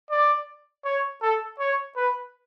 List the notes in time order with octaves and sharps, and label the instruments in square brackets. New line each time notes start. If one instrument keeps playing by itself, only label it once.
[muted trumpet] D5
C#5
A4
C#5
B4